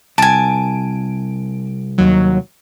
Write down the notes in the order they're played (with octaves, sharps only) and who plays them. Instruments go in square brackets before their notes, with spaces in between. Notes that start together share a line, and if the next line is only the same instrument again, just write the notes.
[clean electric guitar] C2 [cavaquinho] G#5 A5 [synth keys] D7
[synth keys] D#2 F#3